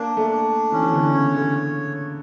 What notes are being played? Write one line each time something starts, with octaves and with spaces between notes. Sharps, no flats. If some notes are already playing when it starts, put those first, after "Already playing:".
Already playing: A#3 D4
A3
D4
E3 C#4
E3
D3
C#3 C#5
D3